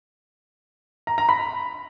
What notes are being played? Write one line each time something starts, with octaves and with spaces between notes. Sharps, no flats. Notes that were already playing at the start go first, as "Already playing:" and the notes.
A#5
A#5
B5